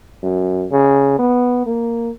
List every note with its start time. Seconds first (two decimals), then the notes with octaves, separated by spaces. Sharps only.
0.23 F#2
0.71 C#3
1.19 B3
1.67 A#3